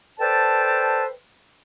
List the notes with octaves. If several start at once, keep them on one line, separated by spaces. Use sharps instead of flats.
A4 B4 C5 D5 G5 A5